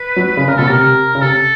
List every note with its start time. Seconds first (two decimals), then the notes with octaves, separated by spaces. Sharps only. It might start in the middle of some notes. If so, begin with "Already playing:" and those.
Already playing: B4
0.16 F#3
0.37 C#3 B4
0.48 C#3 A#4
0.58 B2 A4
0.69 C3 A#4
0.79 C3
1.15 C#3
1.22 C3 A4